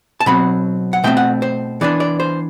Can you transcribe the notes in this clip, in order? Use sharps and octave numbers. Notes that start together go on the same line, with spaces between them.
A5
B2 F#3 C4 B5
F#5
B2 A3 C4 G5
F#5
C5
E3 B3 D4 D5
D5
C5